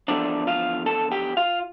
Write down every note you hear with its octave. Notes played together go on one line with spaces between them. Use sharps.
E2 D3 F3 A3 D4 D5
F4 F5
A4 A5
G4 G5
F4 F5